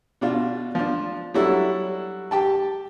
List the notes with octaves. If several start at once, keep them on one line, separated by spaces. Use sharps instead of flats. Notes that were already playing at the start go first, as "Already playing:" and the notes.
B2 D4 F4
F3 D4
F#3 G3 D4 E4 F#4 A4
G4 G5 A5